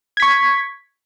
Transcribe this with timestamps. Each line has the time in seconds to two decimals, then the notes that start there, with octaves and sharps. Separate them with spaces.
0.17 G#6
0.20 B6
0.22 C#6